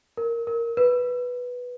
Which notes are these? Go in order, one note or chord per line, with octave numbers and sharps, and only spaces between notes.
A#4
A#4
B4